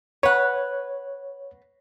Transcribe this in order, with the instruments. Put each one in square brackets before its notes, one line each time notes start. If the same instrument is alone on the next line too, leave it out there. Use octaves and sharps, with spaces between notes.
[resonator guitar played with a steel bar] B4 F#5 [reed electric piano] C#5